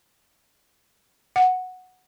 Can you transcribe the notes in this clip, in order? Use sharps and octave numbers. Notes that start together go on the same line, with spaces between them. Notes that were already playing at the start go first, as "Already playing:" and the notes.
F#5